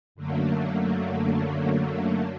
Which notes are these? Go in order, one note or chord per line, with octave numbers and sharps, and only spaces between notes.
F#2 D3 F#3 A3 A#3